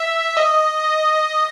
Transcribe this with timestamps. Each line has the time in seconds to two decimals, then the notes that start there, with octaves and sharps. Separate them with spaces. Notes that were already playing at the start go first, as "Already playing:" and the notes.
Already playing: E5
0.37 D#5